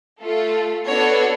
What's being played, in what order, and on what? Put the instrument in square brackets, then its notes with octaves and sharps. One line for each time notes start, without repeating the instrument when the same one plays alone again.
[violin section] A3 F4 A4
B3 D4 F#4 A4 C#5